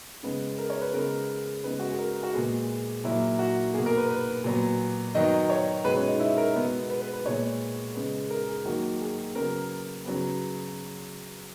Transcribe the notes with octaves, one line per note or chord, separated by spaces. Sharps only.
C#3 G#3 B3
A#4
C#5
B4
C#3 G#3 B3 A#4
C#3 G#3 B3 B4
F#4
G#4
A#4
F#4
A#2 G#3 B3 G#4
A#2 F#3 A#3 E4
F#4
B2 A#3 G#4
A#4
B4
B4
A#2 F#3 B3
D#3 F#3 B3 D#5
C#5
B2 G#3 B3 B4
C#4
D#4
E4
A#4
B2 G#3 B3
B4
B4
B4
A#2 G#3 B3 C#5
C#3 G#3 B3
A#4
G#4
D#3 F#3 A#3 F#4
G#4
C#3 F#3 B3 A#4
C#3 F#3 B3